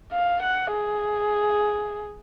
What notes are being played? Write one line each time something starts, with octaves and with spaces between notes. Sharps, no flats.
F5
F#5
G#4